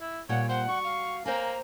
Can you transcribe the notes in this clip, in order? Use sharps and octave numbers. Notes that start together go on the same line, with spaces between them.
E4
A#2 G3 C#5 F#5 G5
C5 F#5
F#4 C#6
F5
A#3 C5 G5 G#5 A#5